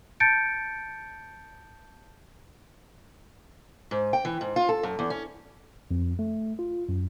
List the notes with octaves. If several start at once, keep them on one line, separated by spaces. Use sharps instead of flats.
A5 G6 A6 C#7 D7
G#2
G5
E3
G#2
F4
A4
F#2
E2
C#4
F2
A3
F4
F#2